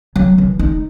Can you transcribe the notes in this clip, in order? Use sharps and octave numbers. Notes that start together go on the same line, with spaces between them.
F#3
E3
D#4